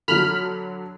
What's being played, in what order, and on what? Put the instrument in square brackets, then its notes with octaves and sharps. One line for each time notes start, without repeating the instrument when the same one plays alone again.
[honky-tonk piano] D3 F#3 [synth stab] B5 F6